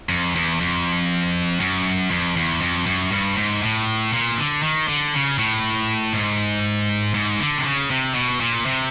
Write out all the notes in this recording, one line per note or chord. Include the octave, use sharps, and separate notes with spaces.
F2
E2
F2
F#2
F2
E2
F2
F#2
G2
G#2
A2
A#2
D3
D#3
D3
C#3
A2
G#2
G#2
D3
C3
C#3
C3
B2
A#2
C3